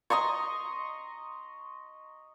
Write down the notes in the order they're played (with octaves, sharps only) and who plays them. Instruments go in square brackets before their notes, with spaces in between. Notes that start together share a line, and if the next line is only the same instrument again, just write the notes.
[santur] D#5 A#5 C6 C#6